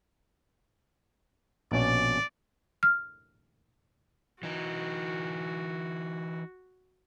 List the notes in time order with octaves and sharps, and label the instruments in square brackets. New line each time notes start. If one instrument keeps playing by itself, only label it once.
[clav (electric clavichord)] A#1 B2 C#4 [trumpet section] D5
[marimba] F6
[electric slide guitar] E3 D#4 [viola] F#4